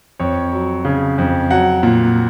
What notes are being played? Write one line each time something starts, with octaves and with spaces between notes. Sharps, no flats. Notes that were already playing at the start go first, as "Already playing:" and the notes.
F2 C#5
F#3
C#3
F2
F#3 F#5
A#2